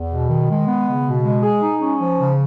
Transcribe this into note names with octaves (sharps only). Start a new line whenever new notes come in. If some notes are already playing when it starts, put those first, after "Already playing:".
Already playing: E2
B2
D#3
G#3
B3
C#3
B2
G#3
G#4
D#4
C#4
F3
C#3